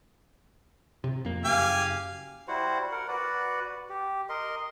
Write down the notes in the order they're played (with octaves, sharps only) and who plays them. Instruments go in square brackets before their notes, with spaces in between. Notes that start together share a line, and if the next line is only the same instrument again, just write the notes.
[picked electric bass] C3
F2 A#3
[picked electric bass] F#1 [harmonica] G4 F5 G#5
[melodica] G3 E4 F#4 C5
A#4 F#5
F#4 B4 D5
G4
A#4 D#5 C6